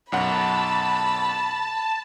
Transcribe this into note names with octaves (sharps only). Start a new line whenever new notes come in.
B1 F#2 F#5 A5 B5